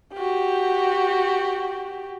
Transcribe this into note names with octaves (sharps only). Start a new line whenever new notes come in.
F#4 G4